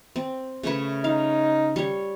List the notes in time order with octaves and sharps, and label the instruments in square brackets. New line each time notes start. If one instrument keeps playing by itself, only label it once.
[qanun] C4
C#3 A3 B4
[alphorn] D#4 [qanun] F5
[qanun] G3 C#5